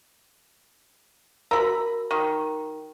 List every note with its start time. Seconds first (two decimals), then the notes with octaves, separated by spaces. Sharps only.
1.51 F#4 A#4 A#5 B5
2.11 D#3